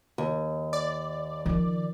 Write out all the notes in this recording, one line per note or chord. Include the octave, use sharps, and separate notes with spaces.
D#2
D5
D#3 F3